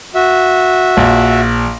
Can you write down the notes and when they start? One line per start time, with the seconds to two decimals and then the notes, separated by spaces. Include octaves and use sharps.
0.15 F#4 E5
0.97 A#1